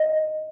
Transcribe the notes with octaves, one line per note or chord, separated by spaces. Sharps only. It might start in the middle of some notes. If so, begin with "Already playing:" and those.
Already playing: D#5